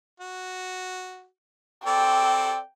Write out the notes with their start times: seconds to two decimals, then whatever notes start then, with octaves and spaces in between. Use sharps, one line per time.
0.20 F#4
1.86 C4 A4 D5 G5